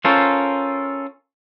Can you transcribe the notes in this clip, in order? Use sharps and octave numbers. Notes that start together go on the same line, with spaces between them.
C#4 F4 A4 A#4 C5